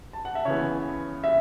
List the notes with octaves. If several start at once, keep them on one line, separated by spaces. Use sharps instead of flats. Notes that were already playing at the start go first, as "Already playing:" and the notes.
A5
F#5
E5
C#3 E3 B3 C#5
E5